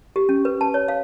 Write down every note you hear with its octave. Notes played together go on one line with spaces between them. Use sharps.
G4
C#4
B4
A5
C#5
F5